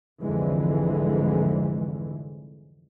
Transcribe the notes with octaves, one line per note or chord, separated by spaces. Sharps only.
C2 F2 G#2 D3 E3 G#3